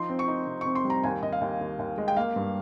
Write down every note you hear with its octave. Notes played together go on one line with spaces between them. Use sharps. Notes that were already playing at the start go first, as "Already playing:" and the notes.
Already playing: F3 D#4 C6
C4
C#6
D#4
C3
C#6
C4
C6
G3
A#5
D#2 G#5
D#2 D#5
F5
D#2
D#2
D#2
G#3
G5
A#3 F5
G2